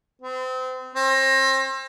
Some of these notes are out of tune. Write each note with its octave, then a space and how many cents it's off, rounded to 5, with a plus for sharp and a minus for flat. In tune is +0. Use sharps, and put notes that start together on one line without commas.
C4 -30
C4 +35